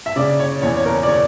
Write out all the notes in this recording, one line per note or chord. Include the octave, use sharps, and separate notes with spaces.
E5
C#3 D5
C#5
E2 C#5
C#5
A#4
D5
C#5